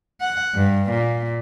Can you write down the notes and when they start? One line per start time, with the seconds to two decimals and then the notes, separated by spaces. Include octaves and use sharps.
0.21 F#5
0.55 G2
0.90 A#2